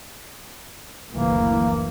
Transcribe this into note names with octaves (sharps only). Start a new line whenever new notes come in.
F#1 D2 E3 A#3